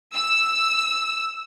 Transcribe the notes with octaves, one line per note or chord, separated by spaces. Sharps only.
E6